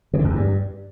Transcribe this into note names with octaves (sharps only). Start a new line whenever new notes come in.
C#3
D3
F2
E2
G2